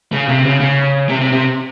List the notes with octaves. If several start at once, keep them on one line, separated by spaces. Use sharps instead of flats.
C#3
C3
C#3
C#3
C3
C3
C3